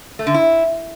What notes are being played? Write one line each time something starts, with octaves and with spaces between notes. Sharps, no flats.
A3
D3
E4